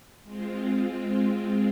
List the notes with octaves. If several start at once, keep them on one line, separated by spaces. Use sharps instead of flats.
G#3 C4 F4